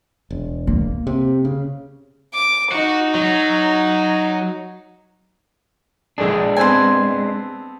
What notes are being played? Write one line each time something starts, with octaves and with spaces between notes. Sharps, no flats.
E1
A#3
C3
C#3
D6
D#4 F#4
F#3
A#1 D3 G#3 D4 G#4
B3 C4 A4 G#5 C6